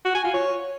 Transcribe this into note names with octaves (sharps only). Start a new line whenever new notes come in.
F#4
G#5
F4
C#5